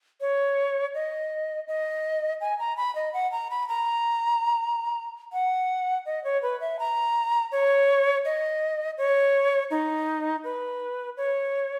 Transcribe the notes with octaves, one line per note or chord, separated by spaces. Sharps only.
C#5
D#5
D#5
G#5
A#5
B5
D#5
F#5
A#5
B5
A#5
F#5
D#5
C#5
B4
E5
A#5
C#5
D#5
C#5
D#4
B4
C#5